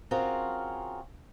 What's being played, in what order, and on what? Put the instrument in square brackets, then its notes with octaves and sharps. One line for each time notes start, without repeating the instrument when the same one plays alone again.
[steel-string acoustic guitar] C4 C#4 F4 F#4 G#4 A#4